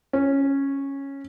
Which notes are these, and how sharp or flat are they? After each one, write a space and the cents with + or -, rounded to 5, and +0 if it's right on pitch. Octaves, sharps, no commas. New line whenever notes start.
C#4 -10